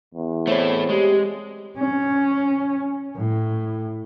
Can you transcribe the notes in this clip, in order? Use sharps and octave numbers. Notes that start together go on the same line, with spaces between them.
E2
A3 C4 E4 C#5 D5
G#3 G4
C#4
A2